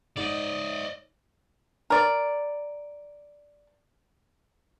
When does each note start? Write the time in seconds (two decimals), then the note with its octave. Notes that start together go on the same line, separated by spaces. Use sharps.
0.17 G#2 D5 D#5
1.90 A#4 D5